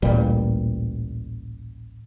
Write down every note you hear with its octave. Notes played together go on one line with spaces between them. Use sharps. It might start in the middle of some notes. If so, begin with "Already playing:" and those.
A1 D2 A#2 G3